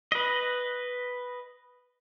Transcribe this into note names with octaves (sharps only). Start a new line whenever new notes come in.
B4 D#5